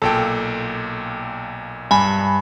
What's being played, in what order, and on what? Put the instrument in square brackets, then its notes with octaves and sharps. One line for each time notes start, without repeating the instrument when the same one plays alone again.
[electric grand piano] B1 A#2 G5 [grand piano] A4
[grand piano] G2 [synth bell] G#5 B5